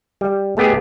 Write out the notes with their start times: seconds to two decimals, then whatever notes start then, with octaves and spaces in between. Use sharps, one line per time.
0.21 G3
0.57 G#3 A3 B3 G4 G#4